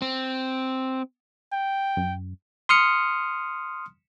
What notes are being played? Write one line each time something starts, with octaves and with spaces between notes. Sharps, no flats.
C4
G5
F#2
C6 D#6 F6 C#7